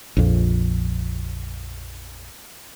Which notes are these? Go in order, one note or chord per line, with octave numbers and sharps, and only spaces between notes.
A#1 F2